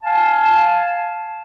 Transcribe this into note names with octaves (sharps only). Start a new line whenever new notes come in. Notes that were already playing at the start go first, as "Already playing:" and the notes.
F5 G#5 A5